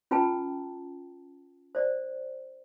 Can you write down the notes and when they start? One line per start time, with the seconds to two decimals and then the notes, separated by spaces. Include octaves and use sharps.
0.11 C#4 F4 B4 G5 A5 A#5
1.75 C5 D5